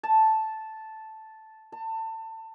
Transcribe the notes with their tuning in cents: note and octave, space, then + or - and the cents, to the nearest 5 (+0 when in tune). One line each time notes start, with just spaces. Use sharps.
A5 -5
A5 +25